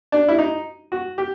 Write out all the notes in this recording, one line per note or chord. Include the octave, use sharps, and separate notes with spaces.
D4
E4
D#4
F#4
G4